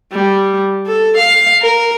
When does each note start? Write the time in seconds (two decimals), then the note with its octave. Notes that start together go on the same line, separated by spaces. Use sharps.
0.12 G3
0.86 A4
1.17 F5
1.62 A#4